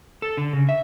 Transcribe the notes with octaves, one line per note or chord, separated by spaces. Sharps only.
A4
D3
C#3
E5